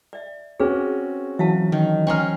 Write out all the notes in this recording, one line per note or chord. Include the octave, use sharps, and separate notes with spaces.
D5 E5
C4 C#4 F#4 G#4 B4
E3 F#3 E5 F5 A5
D#3
C#4 C5 G5 A#5 C6 C#6 F6